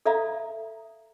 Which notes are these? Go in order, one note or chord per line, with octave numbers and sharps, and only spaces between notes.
A4 D5 E5 F5 A#5